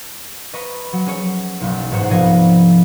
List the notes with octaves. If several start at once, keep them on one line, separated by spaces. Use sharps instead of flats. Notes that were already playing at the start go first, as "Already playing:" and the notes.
B4 D#5 A#5 C#6
F#3
G#3 C#4 G#4 C#5
F#1 B1
A1 G#2 B2 C5 C#5 F#5
C2 F3 B3 D#5 A#5 G#6